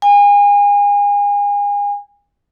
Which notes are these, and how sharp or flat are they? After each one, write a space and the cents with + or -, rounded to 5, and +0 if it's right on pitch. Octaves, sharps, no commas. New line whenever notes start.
G#5 -35